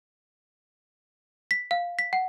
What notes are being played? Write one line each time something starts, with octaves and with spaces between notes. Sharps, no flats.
B6
F5
B6
F#5